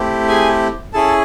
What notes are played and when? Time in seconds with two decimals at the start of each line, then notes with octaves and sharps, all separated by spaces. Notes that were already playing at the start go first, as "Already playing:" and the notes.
Already playing: A3 C4 E4 G4
0.28 G#4 G#5
0.93 C#4 E4 G#4 A4 A5